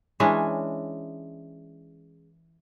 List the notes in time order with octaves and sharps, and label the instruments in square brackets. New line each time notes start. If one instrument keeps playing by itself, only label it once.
[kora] E3 G#3 C#4 D4